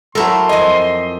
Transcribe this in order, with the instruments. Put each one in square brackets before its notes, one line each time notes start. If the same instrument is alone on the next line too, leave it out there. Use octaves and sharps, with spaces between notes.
[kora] F#3 E4 A4 [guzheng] A3 A#4 [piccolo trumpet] C6
[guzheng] F2 G#5 [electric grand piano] D#5